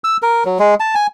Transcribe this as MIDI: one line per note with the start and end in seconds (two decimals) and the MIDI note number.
0.04 0.17 88
0.22 0.44 70
0.45 0.58 54
0.59 0.74 56
0.80 0.95 81
0.95 1.07 80